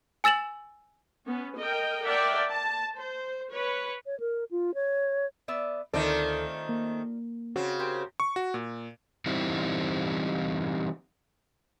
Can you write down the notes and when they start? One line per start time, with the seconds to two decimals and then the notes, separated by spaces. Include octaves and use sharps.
0.24 G#5 E6 A6 E7 F#7
1.26 B3 C#4
1.58 A#4 D#5 G5
2.04 A#4 D5 E5 F#5 G5 A5
2.48 A5
2.96 C5
3.52 B4 C#5
4.06 C#5
4.20 A#4
4.51 F4
4.74 C#5
5.48 B3 D5 E5
5.94 D2 D#3 A3 C4 D#4 F4 A4 D5
6.69 A#3
7.56 C#3 C4 F#4
7.79 G4 A#4 C5
8.20 C#6
8.36 F#4
8.54 A#2
9.26 E3 G3 C4 D#4 E4